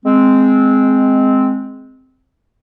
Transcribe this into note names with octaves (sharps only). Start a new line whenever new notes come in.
G#3 C4